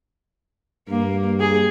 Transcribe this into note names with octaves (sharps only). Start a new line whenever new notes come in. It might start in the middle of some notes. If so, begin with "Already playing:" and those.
G2 A#3
G#4